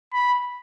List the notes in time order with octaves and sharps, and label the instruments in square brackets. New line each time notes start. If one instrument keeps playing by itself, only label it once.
[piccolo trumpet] B5